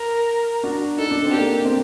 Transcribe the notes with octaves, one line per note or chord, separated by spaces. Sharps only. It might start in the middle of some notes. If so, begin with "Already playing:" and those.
Already playing: A#4
D4 F#4
D#4 A4
D4
C4
G4
A#3 D4
A3 C4